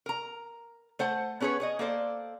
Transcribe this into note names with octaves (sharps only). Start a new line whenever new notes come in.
A#4 A#5
A3 C5 F#5 A5
B3 C#4 G#4 B4 C#5
G#4 C#5 D#5
A#3 A4 C5 D5